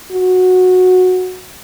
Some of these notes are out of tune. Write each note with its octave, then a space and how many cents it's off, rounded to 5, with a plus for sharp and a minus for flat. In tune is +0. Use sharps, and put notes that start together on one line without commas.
F#4 -10